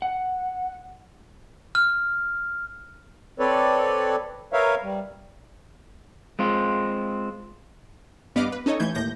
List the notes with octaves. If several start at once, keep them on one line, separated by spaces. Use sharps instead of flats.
F#5
F6
C4 A4 B4 C#5 D5
A#4 B4 C#5 E5 F5
G3
G#3 C4 F4
G2 B3 B4 D#5 F5 D6
B4
C#4 D#4 A4 C#5 D#5
A1 E3 A3 G6 G#6
D#2 A2 G6 A#6